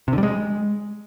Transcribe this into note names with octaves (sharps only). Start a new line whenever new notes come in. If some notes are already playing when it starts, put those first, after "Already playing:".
C3
D3
G3
G#3